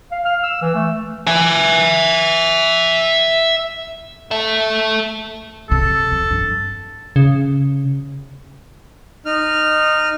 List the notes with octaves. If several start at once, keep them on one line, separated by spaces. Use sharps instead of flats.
F5
F6
E6
E3
A3
E5 G#5
A4 E5
E2 C3 A4
F2
G2
C#3
D#4 F6